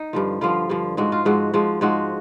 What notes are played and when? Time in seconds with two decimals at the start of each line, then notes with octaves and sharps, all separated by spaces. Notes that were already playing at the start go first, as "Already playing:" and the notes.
Already playing: D#4
0.13 G2 D3 F3
0.41 G2 D3 F3 F4
0.69 G2 D3 F3
0.97 G#2 F3 G#3 F#4
1.12 F4
1.25 G#2 F3 G#3 F#4
1.54 G#2 F3 G#3
1.81 G#2 F3 G#3 F#4